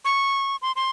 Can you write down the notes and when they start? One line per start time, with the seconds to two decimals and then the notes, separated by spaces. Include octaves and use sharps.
0.05 C#6
0.62 C6
0.76 C6